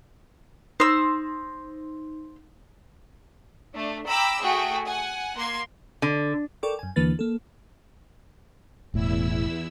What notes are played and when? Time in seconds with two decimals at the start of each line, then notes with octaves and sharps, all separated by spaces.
0.80 D#4 C5 E6
3.73 A3 D4
4.07 G5 A#5 B5 D6 E6
4.42 A3 F#4 G#4 G5
4.85 F#5 G#5
5.36 A#3 C6 G#6
6.02 D3
6.63 A4 A#4 D5 G5 C#6 D6
6.79 F#2 G#5
6.96 D#2 D3 E3 A#3 B4 A6
7.19 A#3 A4
8.94 E1 E2 A2 E4 E6